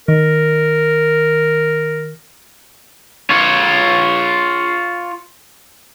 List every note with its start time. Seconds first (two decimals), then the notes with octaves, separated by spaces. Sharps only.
0.08 D#3 A#4
3.30 F4 C#5